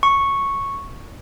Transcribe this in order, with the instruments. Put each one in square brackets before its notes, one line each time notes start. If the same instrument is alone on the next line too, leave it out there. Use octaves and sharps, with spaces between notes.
[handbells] C#6